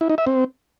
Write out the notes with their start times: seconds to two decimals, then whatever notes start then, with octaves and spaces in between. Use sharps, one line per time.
0.01 E4
0.09 D#4
0.18 E5
0.27 C4